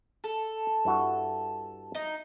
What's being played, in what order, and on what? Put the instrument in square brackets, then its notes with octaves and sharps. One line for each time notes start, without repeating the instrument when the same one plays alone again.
[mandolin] A4 [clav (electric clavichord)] A5
[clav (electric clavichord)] G2 E4 F#4
[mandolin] D#4